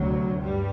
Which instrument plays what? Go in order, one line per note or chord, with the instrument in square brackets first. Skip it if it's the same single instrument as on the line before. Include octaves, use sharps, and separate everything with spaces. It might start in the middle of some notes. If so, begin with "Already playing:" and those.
Already playing: [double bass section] D2 C3 F#3
G2 G3